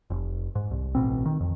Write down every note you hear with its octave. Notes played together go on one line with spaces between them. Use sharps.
F1
G#2
C2
A1 B2 C4
D#3
F2